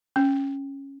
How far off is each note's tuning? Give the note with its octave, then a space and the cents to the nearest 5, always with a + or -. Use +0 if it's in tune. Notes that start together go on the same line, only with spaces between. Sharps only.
C#4 -10